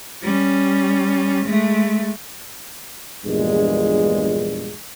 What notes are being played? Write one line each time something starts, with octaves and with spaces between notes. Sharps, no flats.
G3 C#4
G#3 A3
A#1 E2 G2 A#2 G#3